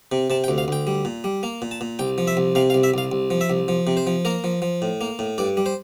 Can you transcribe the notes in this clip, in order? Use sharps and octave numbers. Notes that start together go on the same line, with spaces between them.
C3
C3 A5
G5
D2
F5
D2 G5
G3
A#2
G3
A#3
A#2
A5
A#2
C2 G5
F3
E5
C2
C3 F5
F5
C2
E5
C2 F5
C2
F3
E5
C2
F3
C3
C5
F3
A#3 A#4
F3
F3
A2
A#3
A2
G2 D5
G3
C5